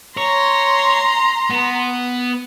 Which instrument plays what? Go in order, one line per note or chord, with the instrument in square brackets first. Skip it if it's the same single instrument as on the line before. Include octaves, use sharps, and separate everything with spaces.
[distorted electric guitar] C#5 [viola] A#5 C6
[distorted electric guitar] B3